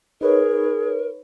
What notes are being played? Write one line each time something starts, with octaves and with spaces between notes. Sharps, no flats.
D#4 G#4 A#4 B4 C#5